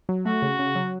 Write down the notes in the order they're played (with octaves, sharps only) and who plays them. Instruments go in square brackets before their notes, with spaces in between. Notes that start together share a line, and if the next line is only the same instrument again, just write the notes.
[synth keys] F#3
[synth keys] A3 [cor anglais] F#4
[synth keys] C#3
C#3
F#3